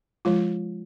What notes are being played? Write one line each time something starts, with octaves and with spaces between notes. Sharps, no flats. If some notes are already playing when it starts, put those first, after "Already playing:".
F3 G#3 F4